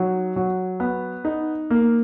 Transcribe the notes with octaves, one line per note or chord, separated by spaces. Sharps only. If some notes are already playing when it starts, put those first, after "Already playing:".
Already playing: F#3 D#4
F#3
B3
D#4
A#3